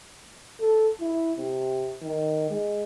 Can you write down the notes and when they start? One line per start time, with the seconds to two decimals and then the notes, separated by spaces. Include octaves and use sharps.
0.60 A4
1.01 E4
1.38 C3
2.02 D#3
2.50 G#3